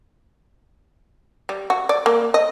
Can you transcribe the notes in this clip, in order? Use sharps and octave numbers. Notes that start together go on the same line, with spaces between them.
G3
F#4
D5
A#3
D#5